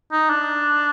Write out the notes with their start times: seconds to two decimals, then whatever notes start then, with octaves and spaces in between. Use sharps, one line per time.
0.11 D#4
0.30 D4